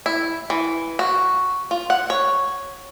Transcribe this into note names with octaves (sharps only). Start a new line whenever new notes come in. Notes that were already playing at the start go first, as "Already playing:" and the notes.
E4
E3
F#4
F4
F#5
C#5